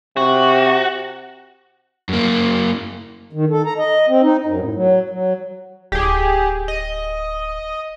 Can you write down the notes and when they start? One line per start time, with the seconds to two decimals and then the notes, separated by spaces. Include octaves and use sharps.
0.17 C3 F#4
2.09 F#2 A#3
3.33 D#3
3.50 A4
3.66 A#5
3.78 D#5
4.09 C4
4.22 D#4
4.46 F#2
4.60 A2
4.74 F#3
5.09 F#3
5.92 D1 G4 G#4
6.68 D#5